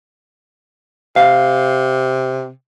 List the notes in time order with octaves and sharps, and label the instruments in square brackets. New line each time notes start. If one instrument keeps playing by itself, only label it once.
[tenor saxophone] C3 [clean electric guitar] F5